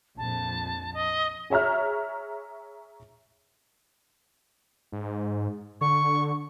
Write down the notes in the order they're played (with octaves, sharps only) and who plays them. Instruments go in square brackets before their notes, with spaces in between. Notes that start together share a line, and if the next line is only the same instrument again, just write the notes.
[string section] A#1 F2 [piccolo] A5
[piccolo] D#5
[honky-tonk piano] G#4 C#5 E5 A#5 F6
[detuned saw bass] G#2
[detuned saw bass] D3 [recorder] C#6